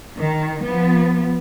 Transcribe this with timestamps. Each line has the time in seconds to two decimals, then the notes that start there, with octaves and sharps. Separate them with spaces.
0.17 D#3
0.64 F3 B3